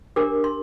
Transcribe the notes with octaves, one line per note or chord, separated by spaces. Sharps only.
D4 G4 A#4 D6
C6